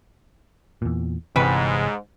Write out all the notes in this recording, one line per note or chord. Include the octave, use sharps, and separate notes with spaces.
E2 A#2
G1 G#2 C3 E3 G3 C#4 B4